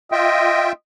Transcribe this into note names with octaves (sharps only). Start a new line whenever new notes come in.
F4 D#5 E5 G5